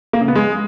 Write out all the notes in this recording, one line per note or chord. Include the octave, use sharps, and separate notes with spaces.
A#3
C#3
B3
G#3